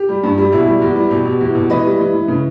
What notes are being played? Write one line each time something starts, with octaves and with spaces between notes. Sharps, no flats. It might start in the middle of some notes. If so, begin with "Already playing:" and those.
Already playing: G4
G3
G2
G3
B2 E4
G3
E2
G3
B2 G4
B2
E2
B2
E3 B4 D#5
G3
E3
E3
C#3